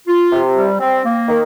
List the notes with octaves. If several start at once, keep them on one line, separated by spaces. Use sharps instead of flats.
F4
C3
G3
C4
A#3
D#3